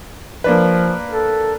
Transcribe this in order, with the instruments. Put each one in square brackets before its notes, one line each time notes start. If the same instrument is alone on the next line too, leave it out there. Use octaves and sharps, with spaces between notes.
[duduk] F3 [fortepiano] A#3 D4 B4
[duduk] A4